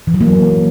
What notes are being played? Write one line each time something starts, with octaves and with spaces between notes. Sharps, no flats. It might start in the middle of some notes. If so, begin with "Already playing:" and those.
E3
F#3
A#3